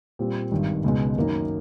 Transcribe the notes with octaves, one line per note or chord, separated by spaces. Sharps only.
A#2 G3 C4 F4
G#1 G2 D#3
C#2 B2 G#3
F#2 D#3 F#3 A#3 D#4